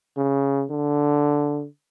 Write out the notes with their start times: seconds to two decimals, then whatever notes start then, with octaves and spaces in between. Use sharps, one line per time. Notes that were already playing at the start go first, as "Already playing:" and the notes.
0.17 C#3
0.70 D3